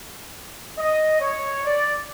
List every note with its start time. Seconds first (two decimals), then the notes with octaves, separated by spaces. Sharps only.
0.78 D#5
1.20 C#5
1.64 D5